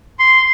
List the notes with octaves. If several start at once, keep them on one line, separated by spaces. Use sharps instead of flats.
C6